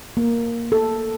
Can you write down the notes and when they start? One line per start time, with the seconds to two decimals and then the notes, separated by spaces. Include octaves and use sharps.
0.17 A#3
0.72 A4